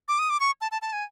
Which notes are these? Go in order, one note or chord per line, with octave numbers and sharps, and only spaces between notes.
D6
D#6
D6
C#6
A5
A5
A5
G#5